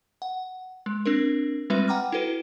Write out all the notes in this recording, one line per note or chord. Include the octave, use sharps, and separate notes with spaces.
F#5
G#3
C4 D4 A#4
G3 G#3 C4 F4 B4 E5
F#5 G5 A#5 D6 F6
E4 F#4 A4 B4